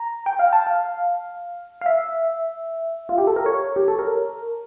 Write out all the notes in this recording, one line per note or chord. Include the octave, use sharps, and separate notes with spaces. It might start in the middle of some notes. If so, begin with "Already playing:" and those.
Already playing: A#5
G5
F5
A5
F5
F5
E5
F4
G4
A4
A#4
C#5
G4
A4
A#4